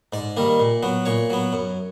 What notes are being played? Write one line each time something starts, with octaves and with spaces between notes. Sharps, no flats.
G#2 D5
D#3 G3 A#3
A#2
F#3 B3
A#2 C#5
F#3 B3
F#2